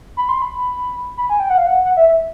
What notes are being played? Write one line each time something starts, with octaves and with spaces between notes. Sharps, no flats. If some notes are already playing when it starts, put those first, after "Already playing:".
B5
C6
B5
B5
G#5
G5
F#5
F5
F#5
F#5
E5
E5